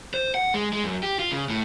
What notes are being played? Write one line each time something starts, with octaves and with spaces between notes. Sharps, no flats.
C5
F#5
G#3
G#3
F#2
G4
F4
C#3
A2